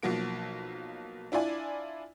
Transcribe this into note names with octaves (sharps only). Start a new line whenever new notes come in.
B1 F3 F#3 A#3 D7
D4 E4 F4 D5 G#5